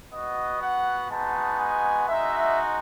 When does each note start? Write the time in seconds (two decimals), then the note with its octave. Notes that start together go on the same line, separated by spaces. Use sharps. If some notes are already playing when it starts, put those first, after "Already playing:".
0.12 B3 F#4 D#5
0.61 F#5
1.10 G#3 B3 D#4 F#4 A5
1.60 G#5
2.08 G#3 D#4 F#4 E5